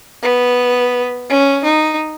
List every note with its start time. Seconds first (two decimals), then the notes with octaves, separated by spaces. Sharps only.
0.22 B3
1.29 C#4
1.64 D#4